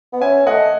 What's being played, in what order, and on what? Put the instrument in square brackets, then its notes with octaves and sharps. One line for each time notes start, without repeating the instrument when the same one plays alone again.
[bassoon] B3
[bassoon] C#4 [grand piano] E5 G#5
[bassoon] A3 [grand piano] D#5 F#5